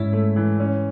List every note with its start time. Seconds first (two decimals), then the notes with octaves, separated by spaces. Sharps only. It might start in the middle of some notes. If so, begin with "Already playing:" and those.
Already playing: G#2 G#3 C#4 E4
0.13 A3
0.36 E3
0.60 C#4